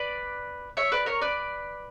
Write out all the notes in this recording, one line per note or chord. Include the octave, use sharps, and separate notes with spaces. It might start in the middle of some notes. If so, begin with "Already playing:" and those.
Already playing: B4 D5
C#5 E5
B4 D5
A#4 C#5
B4 D5